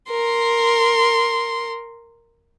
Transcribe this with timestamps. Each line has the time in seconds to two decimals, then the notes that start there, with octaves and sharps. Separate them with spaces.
0.10 A#4 C6